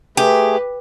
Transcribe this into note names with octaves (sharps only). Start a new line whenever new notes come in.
A3 G4 G#4 B4